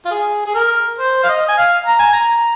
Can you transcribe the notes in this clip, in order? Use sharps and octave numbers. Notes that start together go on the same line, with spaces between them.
F4
G#4
G#4
A#4
C5
F5
D#5
G#5
F5
A#5
G#5
A#5